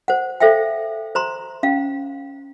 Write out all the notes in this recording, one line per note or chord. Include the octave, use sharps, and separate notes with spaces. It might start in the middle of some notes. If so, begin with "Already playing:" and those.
C5 F#5
A4 C5 E5 F5 G5
C5 A#5 C6
C#4 F5